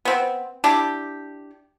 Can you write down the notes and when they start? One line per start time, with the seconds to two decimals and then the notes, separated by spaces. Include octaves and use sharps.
0.05 B3 C4
0.64 D4 E4 G4